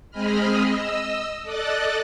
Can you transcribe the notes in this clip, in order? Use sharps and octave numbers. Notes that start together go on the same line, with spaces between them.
G#3 C4 G#4 D#5 B5 F6
D#5 E6
A4 D5 D#5 F#6 A6